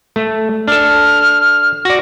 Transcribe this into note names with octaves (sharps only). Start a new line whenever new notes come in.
A3
D4 A4 F6
F#4 D5 A#6